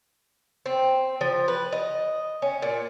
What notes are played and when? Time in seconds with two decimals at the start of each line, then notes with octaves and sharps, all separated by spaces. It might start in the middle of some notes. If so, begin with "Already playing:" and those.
0.66 C4
1.21 F3
1.48 B4
1.72 D#5
2.42 C#4
2.62 A#2